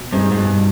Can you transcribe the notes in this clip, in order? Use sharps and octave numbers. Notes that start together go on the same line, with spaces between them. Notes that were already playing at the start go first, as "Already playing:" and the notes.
Already playing: B2
G2 G#3 C4 D#4 G#4
G#2
G2 B2